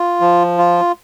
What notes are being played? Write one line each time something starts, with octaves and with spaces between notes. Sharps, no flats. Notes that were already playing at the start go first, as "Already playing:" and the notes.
Already playing: F4
F3
F4